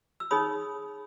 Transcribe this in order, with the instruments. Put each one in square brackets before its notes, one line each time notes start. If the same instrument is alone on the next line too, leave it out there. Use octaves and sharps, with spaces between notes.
[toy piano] E6
D#4 G#4 C#5 B5 D#6